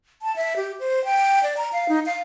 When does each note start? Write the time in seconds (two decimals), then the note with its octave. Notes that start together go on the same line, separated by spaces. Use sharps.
0.22 A5
0.36 E5
0.56 G4
0.80 C5
1.05 G5
1.43 D5
1.57 A#5
1.73 F5
1.89 D#4
2.06 F5